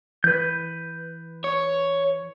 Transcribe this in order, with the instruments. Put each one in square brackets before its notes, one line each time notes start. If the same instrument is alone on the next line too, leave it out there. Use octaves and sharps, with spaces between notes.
[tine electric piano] E3 [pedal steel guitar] B4 G6
[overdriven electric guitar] C#5